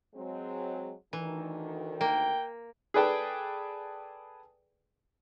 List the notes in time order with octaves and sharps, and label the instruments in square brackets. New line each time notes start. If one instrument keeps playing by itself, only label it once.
[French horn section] F#3 G#3 C4
[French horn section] D2 D#3 [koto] E3
[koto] A#3 [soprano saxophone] G5
[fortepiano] G#4 A4 B4 D5 G5 A5